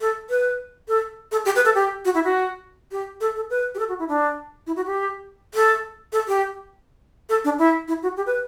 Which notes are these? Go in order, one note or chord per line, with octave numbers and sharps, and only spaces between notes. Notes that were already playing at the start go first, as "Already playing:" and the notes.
A4
B4
A4
A4
G4
B4
A4
G4
F#4
E4
F#4
G4
A4
A4
B4
G4
A4
F#4
E4
D4
E4
F#4
G4
A4
A4
G4
A4
D4
E4
E4
F#4
G4
B4